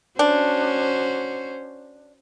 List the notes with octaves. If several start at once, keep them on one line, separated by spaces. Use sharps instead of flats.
C#4 D4 F#4 C5